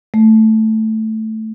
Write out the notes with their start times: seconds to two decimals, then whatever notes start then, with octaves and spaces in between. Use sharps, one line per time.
0.14 A3